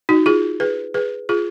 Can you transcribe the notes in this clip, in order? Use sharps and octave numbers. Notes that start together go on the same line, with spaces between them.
D#4 F#4
F4 G#4
G#4 B4
G#4 B4
F4 G#4